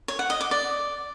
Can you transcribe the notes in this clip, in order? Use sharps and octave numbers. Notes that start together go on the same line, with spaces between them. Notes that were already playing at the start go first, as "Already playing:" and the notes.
C#5
F#5
D#5
D6
D5